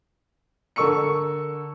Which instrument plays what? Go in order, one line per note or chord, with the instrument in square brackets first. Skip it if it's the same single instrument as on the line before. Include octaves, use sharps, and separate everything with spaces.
[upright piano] D3 A4 A#4 C#6 E6 C#7